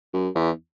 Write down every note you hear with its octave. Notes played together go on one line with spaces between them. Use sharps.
F#2
E2